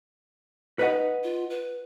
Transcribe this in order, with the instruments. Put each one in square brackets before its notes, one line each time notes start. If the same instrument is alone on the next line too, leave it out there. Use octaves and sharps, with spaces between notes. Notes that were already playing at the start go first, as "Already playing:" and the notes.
[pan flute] D#4 [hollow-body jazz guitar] B4 D#5 F#5
[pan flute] F4
B4